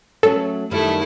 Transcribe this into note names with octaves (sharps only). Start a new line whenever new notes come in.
F#3 A3 C#4 A4
F#2 D#3 G3 A3 E4